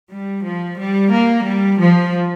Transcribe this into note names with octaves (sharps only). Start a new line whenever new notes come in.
G3
F3
G3
A#3
G3
F3